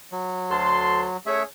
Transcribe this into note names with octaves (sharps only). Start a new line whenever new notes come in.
F#3
D2 A5 C6
A3 C#4 G#4 C#5 E5